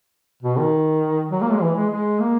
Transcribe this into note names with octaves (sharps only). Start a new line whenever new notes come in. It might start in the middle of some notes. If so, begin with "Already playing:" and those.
B2
D#3
F#3
A#3
G#3
E3
G#3
G#3
A#3